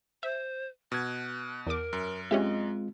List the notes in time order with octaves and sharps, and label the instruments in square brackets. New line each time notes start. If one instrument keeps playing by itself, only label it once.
[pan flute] C5 [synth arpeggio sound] E5
[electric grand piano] B2 G#6 [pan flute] F#6
[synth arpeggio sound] E2 D6 [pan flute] A#4
[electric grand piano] F#2
[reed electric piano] G#3 C4 F4 [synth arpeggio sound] C#4 G4 E5 [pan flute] D#5